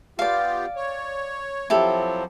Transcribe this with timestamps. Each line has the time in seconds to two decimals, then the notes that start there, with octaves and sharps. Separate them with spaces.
0.19 B3 F4 G4 D5 F5
0.76 C#5
1.70 F3 F#3 C4 E4 G4 A4